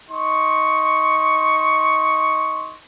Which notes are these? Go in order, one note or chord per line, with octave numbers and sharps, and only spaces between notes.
D#4 C6 C#6